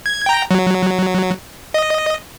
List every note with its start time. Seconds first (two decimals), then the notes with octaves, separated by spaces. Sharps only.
0.06 G#6
0.26 G5 A#5
0.51 F#3
1.74 D#5